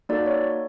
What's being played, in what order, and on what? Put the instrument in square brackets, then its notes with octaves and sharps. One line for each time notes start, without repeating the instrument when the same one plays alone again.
[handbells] A#3 D#4 F#4 A4 D5
C#5